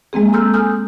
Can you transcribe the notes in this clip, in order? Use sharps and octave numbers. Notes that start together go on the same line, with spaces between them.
G#3 A#3 C4 G#4
A4 A#5 C6 E6 F6 G6
A4 G#5 D#6 F6 G6